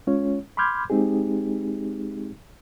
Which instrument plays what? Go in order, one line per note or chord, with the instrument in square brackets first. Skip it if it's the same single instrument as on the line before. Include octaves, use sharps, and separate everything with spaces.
[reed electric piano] G#3 C#4 F4 C#5
B5 C6 D6 F6 G6 G#6
G#3 C4 D#4 G4 G#4